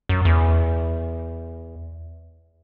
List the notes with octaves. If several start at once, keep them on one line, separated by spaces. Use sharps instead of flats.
F#2
E2